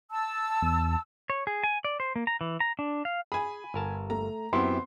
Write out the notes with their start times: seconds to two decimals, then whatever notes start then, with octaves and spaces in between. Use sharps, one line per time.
0.11 A5 E6
0.62 E2
1.30 C#5
1.47 G#4
1.64 G#5
1.85 D5
2.00 C5
2.16 A#3
2.27 A#5
2.41 E3
2.60 A#5
2.79 D4
3.05 F5
3.32 G#4 G#5 B5
3.74 G1 A#4 A5
4.10 A3 A#5
4.53 F#2 B3 C4 E4 G4 C6